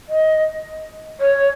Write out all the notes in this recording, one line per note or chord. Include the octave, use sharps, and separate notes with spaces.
D#5
C#5